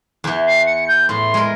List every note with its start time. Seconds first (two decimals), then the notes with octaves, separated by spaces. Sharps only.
0.24 E2 E3
0.47 C7
0.66 C#7
0.88 G6
1.09 A2 C6
1.34 G#3 A#4